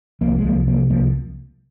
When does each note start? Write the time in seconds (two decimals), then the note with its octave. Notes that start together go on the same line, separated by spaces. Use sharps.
0.21 C2 F3 A#3
0.39 G#3
0.44 C2 F3 A#3
0.67 C3 F3 A#3
0.90 C2 F3 A#3